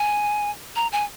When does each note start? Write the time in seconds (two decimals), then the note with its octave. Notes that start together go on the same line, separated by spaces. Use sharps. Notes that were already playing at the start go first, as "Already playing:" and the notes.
Already playing: G#5
0.76 A#5
0.92 G#5